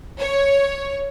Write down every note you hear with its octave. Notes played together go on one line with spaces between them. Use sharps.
C#5